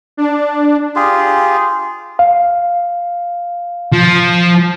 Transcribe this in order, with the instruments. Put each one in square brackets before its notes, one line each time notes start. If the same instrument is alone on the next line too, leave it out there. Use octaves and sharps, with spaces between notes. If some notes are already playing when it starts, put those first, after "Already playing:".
[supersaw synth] D4
[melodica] F4 G4 G#4
[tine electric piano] F5
[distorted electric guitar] F3